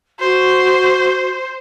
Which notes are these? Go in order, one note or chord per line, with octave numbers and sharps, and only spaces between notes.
F#4 C5